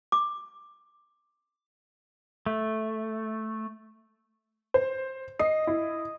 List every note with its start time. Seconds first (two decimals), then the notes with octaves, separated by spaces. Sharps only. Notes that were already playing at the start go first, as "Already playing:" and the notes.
0.12 D6
2.46 A3
4.74 C5
5.39 D#5 C7
5.67 E4